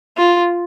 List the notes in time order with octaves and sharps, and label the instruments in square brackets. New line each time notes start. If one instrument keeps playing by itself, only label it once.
[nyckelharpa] F4